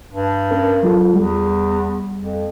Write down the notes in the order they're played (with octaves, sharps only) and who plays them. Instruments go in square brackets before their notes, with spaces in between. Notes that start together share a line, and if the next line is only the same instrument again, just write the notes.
[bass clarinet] G2
[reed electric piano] C#4 A#4
F#3 F4 A4
[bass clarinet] E2 [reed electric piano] G3
[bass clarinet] F2